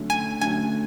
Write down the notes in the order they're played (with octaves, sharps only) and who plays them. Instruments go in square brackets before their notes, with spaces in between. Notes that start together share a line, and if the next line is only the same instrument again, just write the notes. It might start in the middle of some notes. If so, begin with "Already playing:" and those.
Already playing: [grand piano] D3 F#3 A3 C#4
[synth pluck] G#5
[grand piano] D3 F#3 A3 C#4 [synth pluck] G#5